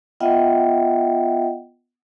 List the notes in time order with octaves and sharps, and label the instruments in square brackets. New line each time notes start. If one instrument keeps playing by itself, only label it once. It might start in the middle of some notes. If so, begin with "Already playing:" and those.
[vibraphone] B3 F4 D#5 E5 F#5 G5